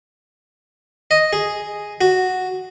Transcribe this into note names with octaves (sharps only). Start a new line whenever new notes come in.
D#5
G#4
F#4